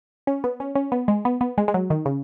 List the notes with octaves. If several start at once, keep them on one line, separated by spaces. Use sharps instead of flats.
C#4
B3
C#4
C#4
B3
G#3
B3
B3
G#3
G#3
F#3
D#3
C#3